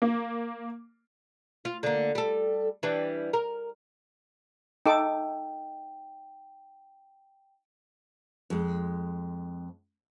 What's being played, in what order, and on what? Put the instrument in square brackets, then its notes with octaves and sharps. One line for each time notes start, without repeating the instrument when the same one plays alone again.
[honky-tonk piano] A#3
[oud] F4
D3 A#3
G3 A4
E3 G3 D4
A#4
[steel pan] D#4 A4 D6 [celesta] G5
[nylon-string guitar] F2 G#3